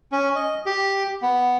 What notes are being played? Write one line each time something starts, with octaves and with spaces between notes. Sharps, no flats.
C#4
D#5
G4
B3